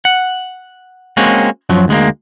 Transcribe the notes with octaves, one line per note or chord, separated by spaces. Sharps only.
F#5
G#3 A#3 C4 C#4 F#4
F#2 F3 F#3
D2 G#3 A#3